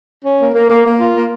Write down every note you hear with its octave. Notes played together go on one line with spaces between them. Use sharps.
C#4
A#3
A#3
A#3
A#3
F4
A#3